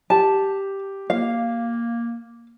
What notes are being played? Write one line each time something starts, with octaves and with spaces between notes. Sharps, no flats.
G4 A5
A#3 F5